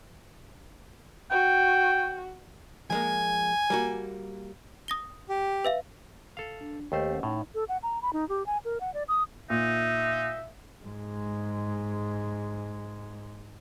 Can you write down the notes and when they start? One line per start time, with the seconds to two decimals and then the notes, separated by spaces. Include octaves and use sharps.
1.31 F#4 G5
2.90 F3 G#3 A#3 G#5
3.70 G3 A#3 F#4
4.88 D#6 A#6 G7
5.29 G4
5.65 B4 E5 F5
6.37 A4 F5
6.61 D4
6.92 D#2 A3 G4 C5 D#5 G5
7.10 C#4 F#5
7.23 A2 D#4
7.55 A4
7.69 F#5
7.83 A#5
8.02 B5
8.13 D#4
8.29 G4
8.46 G#5
8.65 A#4
8.81 F#5
8.94 D5
9.08 D#6
9.50 A#2 D#4 E5
10.84 G#2 G#3